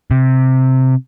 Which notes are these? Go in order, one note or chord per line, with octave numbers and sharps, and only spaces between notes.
C3